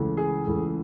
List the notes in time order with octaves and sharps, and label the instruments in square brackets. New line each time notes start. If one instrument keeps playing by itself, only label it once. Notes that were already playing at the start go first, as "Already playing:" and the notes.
Already playing: [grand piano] C#2 C#3 E3 A3
G#4
C#2 C#3 E3 A3